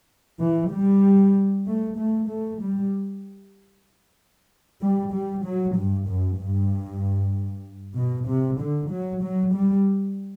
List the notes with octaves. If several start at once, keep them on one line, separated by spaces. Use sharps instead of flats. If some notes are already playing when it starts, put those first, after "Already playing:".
E3
G3
A3
A3
A3
G3
G3
G3
F#3
G2
F#2
G2
B2
C3
D3
F#3
F#3
G3